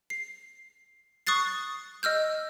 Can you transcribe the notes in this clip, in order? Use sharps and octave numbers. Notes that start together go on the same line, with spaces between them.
C7
C#6 D#6 F#6 A6 C7
D#5 E6 F6 G6